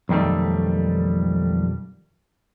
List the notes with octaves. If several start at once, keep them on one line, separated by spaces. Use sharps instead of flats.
B1 F2 D#3 G3 A3